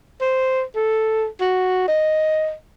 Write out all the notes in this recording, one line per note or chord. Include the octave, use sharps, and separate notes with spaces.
C5
A4
F#4
D#5